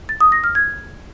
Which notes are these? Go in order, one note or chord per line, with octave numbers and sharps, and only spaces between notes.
A6
D#6
A#6
F6
G#6